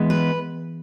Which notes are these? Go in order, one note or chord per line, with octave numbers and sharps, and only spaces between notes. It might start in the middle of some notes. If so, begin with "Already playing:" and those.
Already playing: E3 G#3 B3
B4